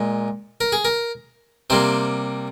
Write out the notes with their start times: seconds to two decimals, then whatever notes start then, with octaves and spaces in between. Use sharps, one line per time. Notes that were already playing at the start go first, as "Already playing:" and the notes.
Already playing: A#2 G#3
0.61 A#4
0.72 G#4
0.85 A#4
1.70 C3 G3 A#3 C5